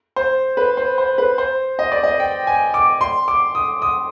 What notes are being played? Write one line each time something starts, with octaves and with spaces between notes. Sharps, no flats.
C5
B4
C5
C5
B4
C5
D#5
D5
D#5
G5
G#5
D6
C6
D6
D#6
D#6